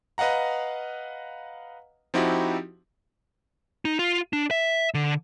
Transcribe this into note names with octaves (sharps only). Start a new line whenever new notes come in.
B4 D#5 F5 F#5 A#5
F3 C4 D#4 E4 F#4 G4
D#4
F4
D4
E5
D3